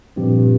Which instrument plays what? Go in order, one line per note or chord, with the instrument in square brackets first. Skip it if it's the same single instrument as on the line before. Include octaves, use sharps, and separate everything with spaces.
[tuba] G2 [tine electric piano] A#2 F3 C4 G4